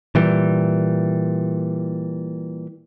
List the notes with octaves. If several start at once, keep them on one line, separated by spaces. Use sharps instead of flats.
A#2 E3 G3